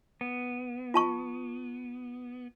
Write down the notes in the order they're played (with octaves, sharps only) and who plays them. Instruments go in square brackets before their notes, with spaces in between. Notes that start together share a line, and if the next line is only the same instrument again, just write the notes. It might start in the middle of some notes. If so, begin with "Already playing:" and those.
[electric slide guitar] B3
[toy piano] F4 A5 C#6